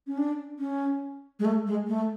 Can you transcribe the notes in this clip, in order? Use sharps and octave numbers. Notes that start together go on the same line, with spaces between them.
C#4
D4
C#4
G#3
A3
G#3
A3